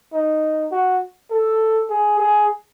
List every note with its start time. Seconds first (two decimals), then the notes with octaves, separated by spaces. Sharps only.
0.14 D#4
0.72 F#4
1.31 A4
1.90 G#4
2.20 G#4